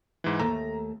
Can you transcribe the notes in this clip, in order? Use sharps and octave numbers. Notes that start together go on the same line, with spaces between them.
G#2 E3
D#2 A3 A#5